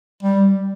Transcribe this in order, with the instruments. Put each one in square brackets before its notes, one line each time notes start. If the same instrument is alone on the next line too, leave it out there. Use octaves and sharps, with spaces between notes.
[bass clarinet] G3